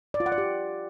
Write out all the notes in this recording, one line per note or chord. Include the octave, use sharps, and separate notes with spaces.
D5
F4
F#5
D5
G4